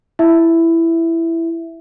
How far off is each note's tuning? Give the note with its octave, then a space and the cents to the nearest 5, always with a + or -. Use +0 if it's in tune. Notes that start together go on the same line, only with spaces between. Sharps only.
E4 +10 E5 +0